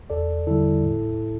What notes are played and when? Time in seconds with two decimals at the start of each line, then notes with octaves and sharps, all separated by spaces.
0.10 E2 A4 D5
0.47 D3 G3 E4 A4
0.84 A2